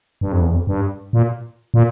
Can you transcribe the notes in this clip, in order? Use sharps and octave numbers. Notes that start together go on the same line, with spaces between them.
G2
F2
E2
F2
G2
A#2
A#2